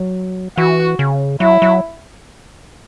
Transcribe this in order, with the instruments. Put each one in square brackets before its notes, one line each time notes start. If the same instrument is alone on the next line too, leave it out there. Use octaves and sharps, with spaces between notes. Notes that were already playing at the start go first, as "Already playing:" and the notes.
Already playing: [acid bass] F#3
[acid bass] E3 [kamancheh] F#4
[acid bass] C#3
[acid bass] F#3 [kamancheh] E4
[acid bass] F#3